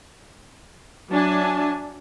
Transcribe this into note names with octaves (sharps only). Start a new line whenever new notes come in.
F#3 D4 E5 G#5 A5